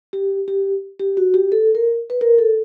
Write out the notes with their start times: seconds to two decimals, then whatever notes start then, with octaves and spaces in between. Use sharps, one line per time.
0.13 G4
0.48 G4
0.99 G4
1.17 F#4
1.34 G4
1.52 A4
1.75 A#4
2.10 B4
2.21 A#4
2.38 A4